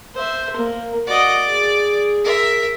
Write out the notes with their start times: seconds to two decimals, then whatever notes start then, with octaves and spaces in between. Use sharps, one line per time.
0.15 C5 E5
0.56 A#3
1.07 F#4 D5 D#5
1.47 G#4
2.24 A#4 E5